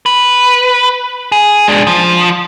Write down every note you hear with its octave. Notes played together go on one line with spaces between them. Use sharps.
B4
G#4
G#3 D4
F3